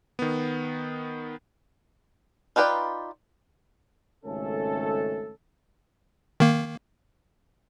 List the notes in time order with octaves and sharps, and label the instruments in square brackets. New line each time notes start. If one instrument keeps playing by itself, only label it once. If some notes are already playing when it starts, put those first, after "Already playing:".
[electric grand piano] D#3 B3
[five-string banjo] D#4 F4 G4 B4 D5
[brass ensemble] G#1 C#2 A3 C#4 A4
[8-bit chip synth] D#3 A#3